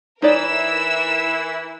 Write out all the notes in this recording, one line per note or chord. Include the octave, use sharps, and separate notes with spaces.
E3 D#4 E4 A#4 C#5 D5 E6